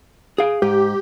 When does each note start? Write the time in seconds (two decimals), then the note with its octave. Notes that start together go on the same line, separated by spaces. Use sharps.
0.38 G#4 F5
0.62 G#2 G4